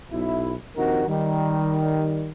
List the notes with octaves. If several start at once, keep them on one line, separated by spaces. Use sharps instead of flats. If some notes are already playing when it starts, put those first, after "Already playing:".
B1 E4
A#1 D#2 C4 D#4 F#4 A#4
D#3 G3